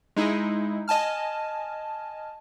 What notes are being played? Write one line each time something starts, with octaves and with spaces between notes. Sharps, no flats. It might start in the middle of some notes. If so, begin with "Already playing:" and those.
G#3 D#4 E4
D#5 G#5 A5 F6